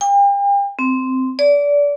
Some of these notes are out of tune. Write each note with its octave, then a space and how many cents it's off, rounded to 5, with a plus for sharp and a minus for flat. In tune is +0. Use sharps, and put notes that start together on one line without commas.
G5 +40
C4 -10
D5 -25